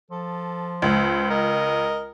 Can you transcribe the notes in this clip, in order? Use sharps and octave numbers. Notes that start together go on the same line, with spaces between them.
F3 A4
C#2 C5
A#4 D#5